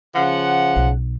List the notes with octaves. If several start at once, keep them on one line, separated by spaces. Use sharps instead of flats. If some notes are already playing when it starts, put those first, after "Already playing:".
C#3 F3 F#5
B1